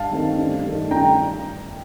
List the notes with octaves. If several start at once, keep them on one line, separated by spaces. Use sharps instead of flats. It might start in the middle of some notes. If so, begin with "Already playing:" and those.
Already playing: G2 F5 A5
D#3 A3 C4
G2
D#3 A3
G2 G5 A#5